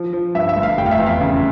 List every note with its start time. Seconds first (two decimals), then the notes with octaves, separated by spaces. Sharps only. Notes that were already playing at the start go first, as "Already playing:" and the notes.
Already playing: F3
0.13 F3
0.35 G2 E5
0.49 E5
0.56 G1
0.63 F5
0.78 F1 G5
0.86 F5
0.91 E5
0.99 E2
1.06 F5
1.21 C#3